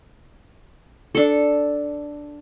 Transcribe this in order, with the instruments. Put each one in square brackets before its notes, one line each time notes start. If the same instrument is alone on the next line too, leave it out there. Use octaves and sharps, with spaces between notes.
[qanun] D4 A4